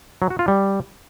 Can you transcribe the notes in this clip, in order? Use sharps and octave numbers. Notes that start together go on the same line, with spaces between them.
F#3
F#4
F4
G3